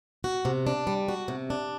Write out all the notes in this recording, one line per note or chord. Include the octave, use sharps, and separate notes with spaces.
F#4
C3
D4
G3
F#4
C3
D4